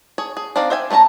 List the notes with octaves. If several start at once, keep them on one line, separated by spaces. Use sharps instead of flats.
G#4 C#5
G#4
C4 D4 D#4 D5 F5
C5 E5 G5 G#5
A3 C#4 E4 A5 A#5